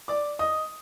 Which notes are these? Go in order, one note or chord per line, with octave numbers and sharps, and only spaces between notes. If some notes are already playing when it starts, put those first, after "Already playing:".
D5 D6
D#5 D#6